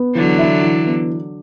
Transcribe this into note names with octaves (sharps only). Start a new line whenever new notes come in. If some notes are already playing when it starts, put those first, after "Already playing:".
Already playing: B3
D3 E3 F#3
E4
E3
B3